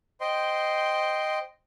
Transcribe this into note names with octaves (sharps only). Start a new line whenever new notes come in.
C5 D#5 G5 C6